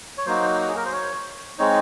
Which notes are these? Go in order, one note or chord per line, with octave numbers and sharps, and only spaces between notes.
C#5
F#3 A#3 D#4 F#4 C5
F#4
G#4
A#4
C5
C#5
G#3 C4 D#4 C#5